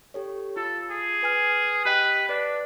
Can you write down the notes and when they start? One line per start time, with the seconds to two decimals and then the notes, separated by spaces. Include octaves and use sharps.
0.14 G4 A4 C#5
0.56 F4 A4
0.90 G#4
1.23 B4 G#5 F6
1.85 G4 B4 D#5 G5
2.29 D4 B4 D5